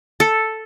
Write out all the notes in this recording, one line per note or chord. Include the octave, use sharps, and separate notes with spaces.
A4